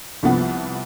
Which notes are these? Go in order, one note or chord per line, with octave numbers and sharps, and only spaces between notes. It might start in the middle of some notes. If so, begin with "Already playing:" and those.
C2 F3 B3